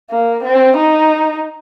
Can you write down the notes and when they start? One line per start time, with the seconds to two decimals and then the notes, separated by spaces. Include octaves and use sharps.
0.11 A#3
0.43 C4
0.77 D#4